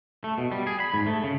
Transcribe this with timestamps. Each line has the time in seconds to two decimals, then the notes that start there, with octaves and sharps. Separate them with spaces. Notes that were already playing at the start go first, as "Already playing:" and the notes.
0.24 A3
0.38 B2
0.52 G3
0.67 G#4
0.80 B5
0.94 G#2
1.07 A3
1.24 C#3